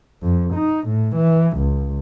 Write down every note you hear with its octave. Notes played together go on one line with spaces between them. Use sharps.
F2
D#4
A2
E3
C#2